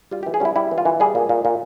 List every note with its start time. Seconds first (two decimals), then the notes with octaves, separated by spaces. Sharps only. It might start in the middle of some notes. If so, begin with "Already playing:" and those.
0.11 G3 F4
0.23 G4
0.26 E3
0.34 G#4
0.40 G3 C#4 E4
0.56 G3 E4
0.71 E3
0.78 F4
0.85 E3
1.00 G3 G#4
1.15 A#2
1.29 A#2
1.45 A#2